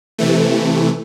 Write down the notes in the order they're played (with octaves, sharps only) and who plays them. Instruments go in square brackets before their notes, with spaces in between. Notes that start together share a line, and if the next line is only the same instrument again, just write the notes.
[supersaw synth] C3 E3 A3